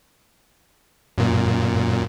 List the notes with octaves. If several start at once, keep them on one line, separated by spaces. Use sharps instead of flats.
F#2 A#2